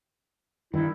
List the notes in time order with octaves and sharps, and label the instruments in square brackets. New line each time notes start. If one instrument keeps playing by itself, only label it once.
[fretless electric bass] G2 D#3 [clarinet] E4